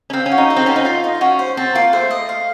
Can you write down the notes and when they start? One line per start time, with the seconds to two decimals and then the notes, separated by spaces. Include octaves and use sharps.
0.10 C#4
0.13 C4 F5
0.26 C#4
0.31 F#4
0.38 D#4
0.50 A4
0.56 C4
0.66 C#4 C5
0.76 D#4
0.85 F4 F5
1.04 D#4
1.21 C#4 F#4
1.39 C5
1.57 C4 A5
1.75 A#3 F4
1.92 A3 C5
2.11 D#5
2.29 F5